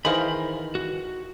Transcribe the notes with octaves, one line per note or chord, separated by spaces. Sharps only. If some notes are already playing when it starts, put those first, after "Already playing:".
D#3 E3 G#4 A#4 C5 F5 B5
F#4